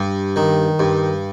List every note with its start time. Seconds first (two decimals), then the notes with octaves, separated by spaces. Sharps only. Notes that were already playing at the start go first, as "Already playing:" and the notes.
Already playing: G2
0.36 D#3
0.80 G2